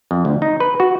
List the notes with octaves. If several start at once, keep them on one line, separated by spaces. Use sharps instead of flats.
F2
D2
D#4
B4
F#4